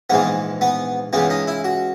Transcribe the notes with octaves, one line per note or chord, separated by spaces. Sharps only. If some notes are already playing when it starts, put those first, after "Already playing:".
A#1 G#2 E3 B3
B3
C#2 C#3 E3 B3
D#4
E4
F#4